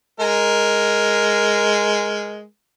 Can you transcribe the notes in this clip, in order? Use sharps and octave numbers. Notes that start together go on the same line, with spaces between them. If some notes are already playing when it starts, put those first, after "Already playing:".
G#3 A#4